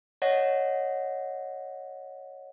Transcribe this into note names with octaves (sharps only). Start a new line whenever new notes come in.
C#5 D#5 F#5 A#6